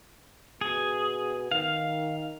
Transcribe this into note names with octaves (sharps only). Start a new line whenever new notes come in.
B2 G#4
D#3 F5